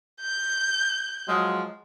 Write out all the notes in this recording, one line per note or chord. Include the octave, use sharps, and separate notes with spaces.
G6
F3 F#3 G#3